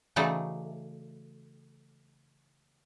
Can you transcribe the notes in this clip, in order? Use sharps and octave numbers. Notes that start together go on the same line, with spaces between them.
C#3 E3 F#3 A3 D#4 D5